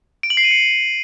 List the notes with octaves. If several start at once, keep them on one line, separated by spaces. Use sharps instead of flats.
D7
F#7
C7
D#7
C#7